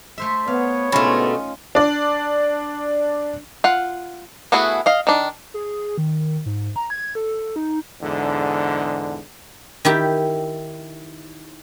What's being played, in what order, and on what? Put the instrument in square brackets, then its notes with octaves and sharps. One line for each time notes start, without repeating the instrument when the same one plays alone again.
[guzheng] A3 C5 E5
[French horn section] B3 [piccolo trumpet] C#5 [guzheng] F5
[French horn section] G#2 D3 B3 [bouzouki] B2 A3 [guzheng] C#4 D#4 F4
[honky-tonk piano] D4 D5
[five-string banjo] F4 F#5
A3 B3 E4 F#4 G#4
D#5 F5
D#3 D4
[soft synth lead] G#4
D#3
G#2
A#5
G#6
A4
D#4
[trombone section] E2 G#2 D3
[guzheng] D#3 E4 G4